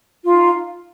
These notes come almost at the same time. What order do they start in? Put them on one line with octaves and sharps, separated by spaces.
F4 F5 D#4